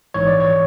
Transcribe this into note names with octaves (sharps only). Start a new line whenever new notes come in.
A#1 G#2 E3 C#5
D5
C#5